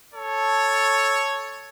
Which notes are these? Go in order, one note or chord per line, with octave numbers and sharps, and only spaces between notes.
A4 C#5